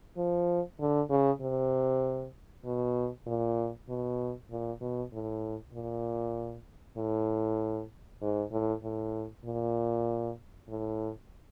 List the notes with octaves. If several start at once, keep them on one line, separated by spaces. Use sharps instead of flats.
F3
D3
C#3
C3
B2
A#2
B2
A#2
B2
A2
A#2
A2
G#2
A2
A2
A#2
A2